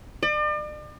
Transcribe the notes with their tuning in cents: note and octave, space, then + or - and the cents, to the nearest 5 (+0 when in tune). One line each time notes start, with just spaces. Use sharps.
D5 +40